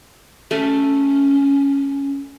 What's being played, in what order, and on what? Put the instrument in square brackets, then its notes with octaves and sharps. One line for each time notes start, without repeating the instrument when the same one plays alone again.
[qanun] A3 [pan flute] C#4